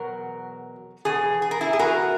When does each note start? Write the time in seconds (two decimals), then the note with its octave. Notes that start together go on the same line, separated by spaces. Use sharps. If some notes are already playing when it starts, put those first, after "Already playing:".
Already playing: E2 B2 F#3 F#4 A#4
1.05 E2 B2 G#4
1.42 G#4
1.51 A#4
1.61 E4 G#4
1.73 G#4
1.79 F#4 A#4